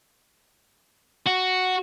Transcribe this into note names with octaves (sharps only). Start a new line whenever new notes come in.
F#4